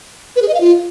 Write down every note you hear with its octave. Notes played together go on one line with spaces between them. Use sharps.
B4
G#4
D#5
F5
F4